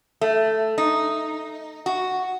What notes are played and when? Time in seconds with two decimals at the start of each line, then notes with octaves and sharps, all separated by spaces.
0.21 A3
0.78 D#4
1.86 F#4